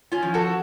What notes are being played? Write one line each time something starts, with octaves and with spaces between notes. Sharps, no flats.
C#4 F4
F3
F#4 A4